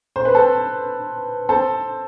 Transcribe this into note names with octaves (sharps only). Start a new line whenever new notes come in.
C5
B4
A4 C5
A4 C5